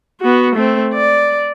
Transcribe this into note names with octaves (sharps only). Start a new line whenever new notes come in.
B3 F#4
A3 C4
D5